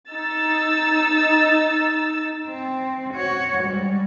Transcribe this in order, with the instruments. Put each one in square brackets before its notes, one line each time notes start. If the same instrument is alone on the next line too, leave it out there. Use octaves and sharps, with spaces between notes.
[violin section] D#4 E6 A6
[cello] C4
F#4 C#5
G3 G#3